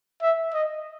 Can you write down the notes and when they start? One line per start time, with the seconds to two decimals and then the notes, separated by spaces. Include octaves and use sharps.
0.22 E5
0.53 D#5